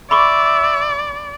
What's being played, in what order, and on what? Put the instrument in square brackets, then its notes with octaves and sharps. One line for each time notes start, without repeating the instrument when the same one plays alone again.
[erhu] D5 [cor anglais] E5 [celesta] B5 C#6 D6